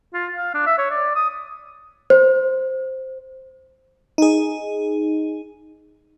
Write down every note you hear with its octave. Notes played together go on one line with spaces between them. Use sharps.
F4
F5
D4
E5
C#5
D5
D#6
C5
D#4 G#4